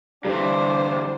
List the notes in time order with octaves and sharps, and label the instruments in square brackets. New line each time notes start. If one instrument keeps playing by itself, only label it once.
[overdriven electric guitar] G2 E3 [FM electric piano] D3 G3 [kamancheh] D4 C5